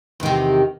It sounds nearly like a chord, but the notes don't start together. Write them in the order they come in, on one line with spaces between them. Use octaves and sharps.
E2 D#3 C3